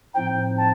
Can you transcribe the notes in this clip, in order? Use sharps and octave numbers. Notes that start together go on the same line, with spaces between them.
A2 F3 C4 D#4 G5
A5